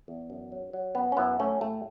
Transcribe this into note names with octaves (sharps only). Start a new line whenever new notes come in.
E2
F#2
F#3
F#3
F#2 B3
C#4
F#2 B3 E4
F#3 A3 C#4
A2 A3